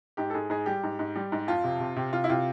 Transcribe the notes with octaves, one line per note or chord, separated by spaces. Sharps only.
G#2 G4
A4
G#2 G#4
G#2 G#4
G3 G4
G#2
G#2
G3
G#2
F2 F4
C3
C3
C3
C3 F4
E4
C3 F4